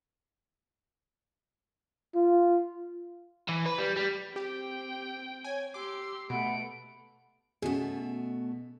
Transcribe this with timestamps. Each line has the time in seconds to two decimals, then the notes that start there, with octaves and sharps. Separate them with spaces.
2.15 F4
3.49 E3
3.66 B4
3.78 G3
3.97 G3
4.36 C4 G4 G5
5.45 C#5 G#5
5.74 G4 C6 D6 E6
6.30 B2 A3 F#5 B5 D7
7.62 B2 A3 C#4 F#4 G#4